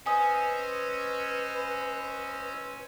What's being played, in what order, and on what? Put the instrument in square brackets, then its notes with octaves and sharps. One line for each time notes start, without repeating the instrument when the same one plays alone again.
[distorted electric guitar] C#4 [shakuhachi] B4 [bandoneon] C5 D#5 E6 [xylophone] G#5 D#6